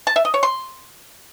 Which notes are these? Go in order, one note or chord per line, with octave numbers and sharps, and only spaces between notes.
A5
E5
D#5
C#5
C6